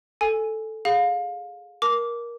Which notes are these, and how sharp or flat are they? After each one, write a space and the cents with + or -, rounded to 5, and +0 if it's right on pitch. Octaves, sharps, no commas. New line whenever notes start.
A4 +0 G#5 +0
G#4 +0 F5 +25
A#4 +20 A5 +0 D6 -15